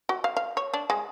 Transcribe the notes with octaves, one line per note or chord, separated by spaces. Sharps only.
F#4
F5
F5
C#5
D4
G#3